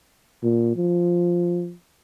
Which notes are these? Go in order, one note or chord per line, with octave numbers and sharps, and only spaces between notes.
A#2
F3